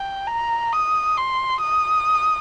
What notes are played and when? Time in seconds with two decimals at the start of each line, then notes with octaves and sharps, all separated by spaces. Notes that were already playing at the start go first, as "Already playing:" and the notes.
Already playing: G5
0.27 A#5
0.72 D#6
1.17 C6
1.62 D#6